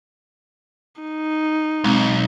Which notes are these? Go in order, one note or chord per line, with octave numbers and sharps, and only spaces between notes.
D#4
B1 G#3 C4